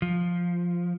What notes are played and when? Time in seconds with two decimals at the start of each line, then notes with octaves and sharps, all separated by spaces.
0.02 F3